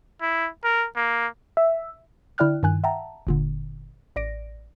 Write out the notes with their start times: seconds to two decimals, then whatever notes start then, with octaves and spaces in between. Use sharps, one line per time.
0.21 E4
0.64 A#4
0.96 A#3
1.57 E5
2.38 D3 E4 D5 G5 F6 F#6
2.63 G2 D#3 G#5 F#6
2.84 E5 F#5 G5 A5 A#5
3.27 G1 A#2 D3
4.16 A1 D5 A#6 D7